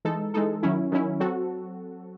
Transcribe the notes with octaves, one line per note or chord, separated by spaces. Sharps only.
E3 G#3 D#4 A4
E3 G#3 D#4 A4
D#3 F#3 C#4 E4
D#3 F#3 C#4 E4
F#3 C4 F#4 A4